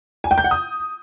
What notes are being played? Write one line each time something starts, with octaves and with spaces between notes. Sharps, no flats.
G#5
G5
G6
F#5
D#6